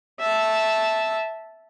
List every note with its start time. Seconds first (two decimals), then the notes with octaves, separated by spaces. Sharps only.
0.20 E5 A5